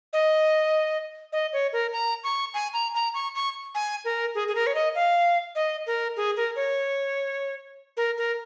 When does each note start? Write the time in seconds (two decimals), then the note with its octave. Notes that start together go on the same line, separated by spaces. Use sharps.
0.13 D#5
1.33 D#5
1.53 C#5
1.73 A#4
1.93 A#5
2.24 C#6
2.54 G#5
2.73 A#5
2.95 A#5
3.14 C#6
3.35 C#6
3.75 G#5
4.05 A#4
4.35 G#4
4.48 G#4
4.55 A#4
4.67 C#5
4.75 D#5
4.95 F5
5.55 D#5
5.87 A#4
6.17 G#4
6.37 A#4
6.56 C#5
7.97 A#4
8.18 A#4